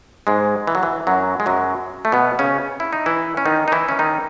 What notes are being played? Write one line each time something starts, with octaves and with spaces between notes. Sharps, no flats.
G#2 G#3
E3
F#3
E3
F#2 F#3
G#3
F#2 F#3
A3
B2 B3
C#3 C#4
E4
D#4
E3 E4
C#4
D#3 D#4
D#4
E3 E4
C#4
D#3 D#4